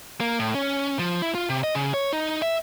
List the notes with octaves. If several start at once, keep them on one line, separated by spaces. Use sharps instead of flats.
A#3
A2
C#4
F3
E4
F4
C3
D#5
C#3
C#5
D#4
E5